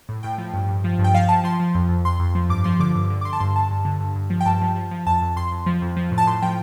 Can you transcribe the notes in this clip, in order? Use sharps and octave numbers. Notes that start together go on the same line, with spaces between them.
A2
A2 G5
F3
G2
G2
F3
G2
G5
F3 F5
F3 A5
F3 C6
F3
F2
F2
F2 C6
F2
F3
G2 D6
F3 C6
D3 D6
G2
D3
D6
D3 C6
A5
G2 C6
G2 A5
G2
D3
G2
G2
F3
G5
G2 A5
F3
F3
F3
F2 A5
F2
F2 C6
F2
F3
F2
F3
A2
A5
A2 C6
F3 G5